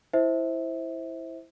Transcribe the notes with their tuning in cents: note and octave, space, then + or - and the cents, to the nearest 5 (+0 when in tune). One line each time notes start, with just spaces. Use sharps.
E4 +0 C5 +0 E5 -25